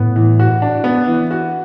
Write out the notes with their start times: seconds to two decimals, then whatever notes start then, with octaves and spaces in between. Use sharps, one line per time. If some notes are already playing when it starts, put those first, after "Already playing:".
Already playing: A2 B3
0.16 E3
0.40 F#4
0.62 D4
0.84 B3
1.07 E3
1.31 F#4